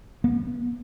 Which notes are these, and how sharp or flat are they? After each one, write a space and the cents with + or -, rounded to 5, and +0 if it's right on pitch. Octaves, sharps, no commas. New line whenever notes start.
B3 -35